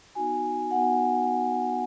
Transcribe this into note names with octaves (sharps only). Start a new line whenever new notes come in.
B3 D#4 F#4 G#5
F#5
B3 D#4 F#4 G#5